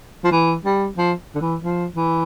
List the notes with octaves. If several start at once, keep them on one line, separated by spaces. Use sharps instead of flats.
F3
E3
G3
F3
D3
E3
F3
E3